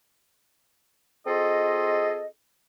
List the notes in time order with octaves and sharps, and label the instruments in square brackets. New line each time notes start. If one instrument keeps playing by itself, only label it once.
[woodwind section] C4 F4 G#4 A4 D#5